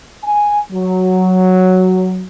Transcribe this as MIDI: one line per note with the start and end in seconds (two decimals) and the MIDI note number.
0.24 0.58 80
0.72 2.26 54